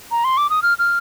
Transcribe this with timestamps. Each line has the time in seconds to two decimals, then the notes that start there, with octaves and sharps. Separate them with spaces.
0.11 A#5
0.24 C6
0.37 D6
0.50 D#6
0.63 F6
0.79 F6